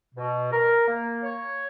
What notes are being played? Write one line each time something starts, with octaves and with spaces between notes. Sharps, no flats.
B2
A#4
A#3
C#5